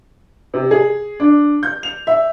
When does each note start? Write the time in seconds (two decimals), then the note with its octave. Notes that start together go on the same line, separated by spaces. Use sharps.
0.54 C3
0.71 G#4
1.20 D4
1.63 G6
1.83 F7
2.07 E5